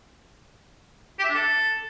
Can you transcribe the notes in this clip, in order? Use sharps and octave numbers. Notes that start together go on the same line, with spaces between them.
G4
E5
D4
A4